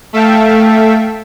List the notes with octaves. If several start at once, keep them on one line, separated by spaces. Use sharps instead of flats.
A3 A4 E5 F5 G5